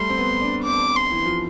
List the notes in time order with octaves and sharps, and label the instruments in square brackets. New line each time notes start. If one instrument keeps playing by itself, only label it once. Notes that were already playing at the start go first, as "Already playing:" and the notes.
Already playing: [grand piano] G3 A3 [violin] C6
[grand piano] C4
B3
D4
[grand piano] C4 [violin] D6
[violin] C6
[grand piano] E3
F3